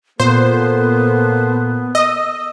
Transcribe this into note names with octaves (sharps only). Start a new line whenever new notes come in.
A#2 A#3 B3 A4 C5
D#5 D#6 E6